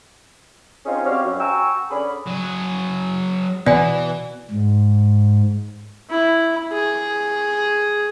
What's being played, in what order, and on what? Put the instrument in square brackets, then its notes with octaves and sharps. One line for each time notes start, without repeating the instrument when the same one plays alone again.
[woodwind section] C4 C#4 D#4 F4 G#4
G3 C4 C#4 F#4 D5 F5
F#2
F#4 G5 G#5 A#5 C#6 E6
D3 C#4 G#4 D5 B5
[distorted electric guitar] F#3 G#4
[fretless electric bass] B2 [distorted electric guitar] E3 [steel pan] B3 [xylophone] D5 G#5
[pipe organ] G#2
[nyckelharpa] E4
G#4